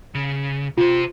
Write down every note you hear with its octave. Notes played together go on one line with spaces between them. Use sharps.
C#3
C3 F4 C5